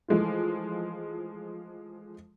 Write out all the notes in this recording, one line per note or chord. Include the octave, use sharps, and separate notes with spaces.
E3 F3 G#3 A3 F4